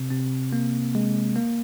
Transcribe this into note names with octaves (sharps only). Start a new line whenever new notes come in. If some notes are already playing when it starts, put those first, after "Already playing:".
Already playing: C3 C4
C3 C4
A#3
G#3
A#3